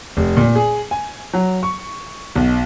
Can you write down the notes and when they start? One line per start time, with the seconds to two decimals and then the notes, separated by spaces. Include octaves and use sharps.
0.17 F1
0.37 A#2
0.56 G#4
0.91 G#5
1.33 F#3
1.63 C#6
2.35 B1